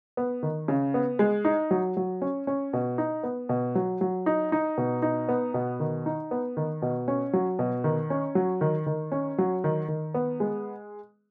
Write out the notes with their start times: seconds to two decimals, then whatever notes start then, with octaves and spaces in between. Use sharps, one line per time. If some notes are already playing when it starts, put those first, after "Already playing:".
0.17 B3
0.43 D#3
0.68 C#3
0.94 B3
1.19 G#3
1.45 D#4
1.71 F#3
1.97 F#3
2.22 C#4
2.47 C#4
2.73 B2
2.98 D#4
3.23 B3
3.49 B2
3.75 F#3
4.01 F#3
4.26 D#4
4.52 D#4
4.78 B2
5.02 D#4
5.29 B3
5.54 B2
5.80 D#3
6.06 D#4
6.31 B3
6.57 D#3
6.82 B2
7.08 C#4
7.33 F#3
7.59 B2
7.84 D#3
8.10 C#4
8.35 F#3
8.61 D#3
8.86 D#3
9.12 C#4
9.38 F#3
9.64 D#3
9.88 D#3
10.14 B3
10.40 G#3